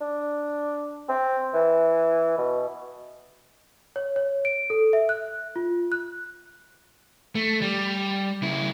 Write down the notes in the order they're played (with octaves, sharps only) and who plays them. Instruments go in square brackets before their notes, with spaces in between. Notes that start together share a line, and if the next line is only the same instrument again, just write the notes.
[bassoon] D4
C4
E3
B2
[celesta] C#5
C#5
D7
A4
E5
F#6
F4
F#6
[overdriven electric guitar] A3
G3
C#3 E4